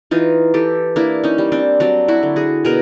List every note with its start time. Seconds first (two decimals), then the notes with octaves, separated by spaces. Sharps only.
0.11 E3 D#4 F4
0.54 E3 G4 A4
0.96 A#3 D4 E4
1.24 C#4 D#4
1.38 G3
1.52 C4 D4
1.80 F#3 C4 D4
2.08 E4 F#4
2.23 D3
2.36 F#4 G#4
2.65 B2 G#4 A#4